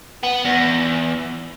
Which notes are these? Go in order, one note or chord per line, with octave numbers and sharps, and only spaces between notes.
B3
E2